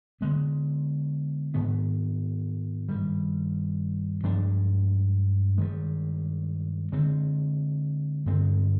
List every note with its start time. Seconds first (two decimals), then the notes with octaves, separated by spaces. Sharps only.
0.21 D3 G#3 B3
1.54 G#2 D#3 B3
2.89 G2 D#3 G3
4.23 G2 F3 G#3 D4
5.58 G2 D#3 G#3
6.92 D3 G#3 C4
8.26 G2 D3 G#3 C4